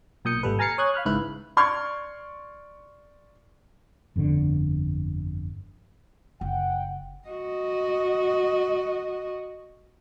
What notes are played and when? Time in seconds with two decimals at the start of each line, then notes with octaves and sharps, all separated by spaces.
0.25 B1 A#2 D#6 G6 C#7
0.43 G#1 G3 A4 B4
0.59 G#5 A#5 F6 A6 C7 C#7
0.78 C#5 D#6 F#6 G#6
0.94 F5 B5 F6 F#6
1.05 G#1 C#2 G#2 E4 B4 F#6
1.57 D5 C6 C#6 F6 G#6
4.16 G1 F2 A#2 D3
6.41 F#1 F#5 G5
7.28 F#4 D#5